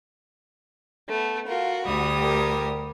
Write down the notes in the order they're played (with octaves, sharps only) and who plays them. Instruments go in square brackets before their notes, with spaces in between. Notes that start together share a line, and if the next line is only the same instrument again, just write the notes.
[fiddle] A3 B3
[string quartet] F4 A#4 [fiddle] F#4
[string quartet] D2 G3 D#6
[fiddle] G4 A#4